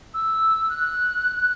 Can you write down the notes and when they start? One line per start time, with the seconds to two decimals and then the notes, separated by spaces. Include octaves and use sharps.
0.14 E6
0.69 F#6